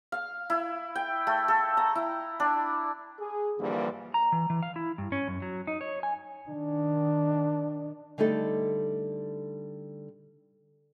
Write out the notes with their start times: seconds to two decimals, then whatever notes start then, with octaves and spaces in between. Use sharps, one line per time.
0.12 F5
0.50 E4
0.95 G5
1.27 A3
1.48 A4
1.77 A#5
1.95 E4
2.40 D4
3.19 G#4
3.59 G2 D3 E3 F3 G3 A#3
4.14 A#5
4.32 E3
4.50 E3
4.63 F5
4.76 E4
4.98 G2
5.12 C#4
5.28 F#2
5.42 F#3
5.67 D#4
5.81 C#5
6.03 G#5
6.48 D#3 D4
8.18 D3 G3 A3 D#4 A4